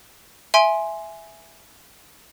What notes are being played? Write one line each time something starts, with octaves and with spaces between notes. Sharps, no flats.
E5 G#5 C6 D7